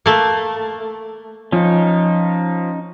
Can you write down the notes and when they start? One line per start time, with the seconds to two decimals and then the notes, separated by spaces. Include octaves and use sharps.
0.06 A3 A#3
1.52 F3 C#4 D#4